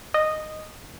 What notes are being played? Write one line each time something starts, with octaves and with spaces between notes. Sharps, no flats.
D#5